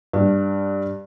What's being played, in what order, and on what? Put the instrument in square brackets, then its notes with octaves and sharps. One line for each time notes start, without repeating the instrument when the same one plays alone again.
[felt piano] G2 B4